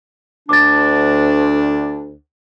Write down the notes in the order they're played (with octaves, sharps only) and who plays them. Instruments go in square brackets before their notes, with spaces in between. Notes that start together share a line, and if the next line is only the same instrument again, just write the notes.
[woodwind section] D2 D4 [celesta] D6 A6